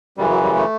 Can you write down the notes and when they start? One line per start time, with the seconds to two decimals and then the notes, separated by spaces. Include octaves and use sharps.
0.17 F#2 C#3 E3 G3
0.30 F#3
0.43 G3
0.55 A3